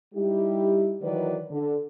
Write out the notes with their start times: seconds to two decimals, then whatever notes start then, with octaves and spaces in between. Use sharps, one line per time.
0.14 G3 D#4 E4 G4
1.01 D#3 E3 F#3 A#4 B4 D5
1.50 D3